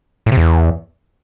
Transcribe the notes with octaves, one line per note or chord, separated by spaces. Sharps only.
A2
C3
E2